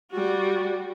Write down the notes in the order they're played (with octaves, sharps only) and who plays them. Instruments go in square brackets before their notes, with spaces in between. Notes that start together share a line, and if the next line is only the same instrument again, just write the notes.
[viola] G3 F#4